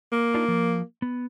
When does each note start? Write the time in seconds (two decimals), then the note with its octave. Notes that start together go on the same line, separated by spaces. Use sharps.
0.12 A#3
0.34 D4 D#4 F4
0.48 F3
1.02 B3